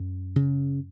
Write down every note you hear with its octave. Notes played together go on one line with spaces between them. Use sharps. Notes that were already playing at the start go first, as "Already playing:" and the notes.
Already playing: F#2
C#3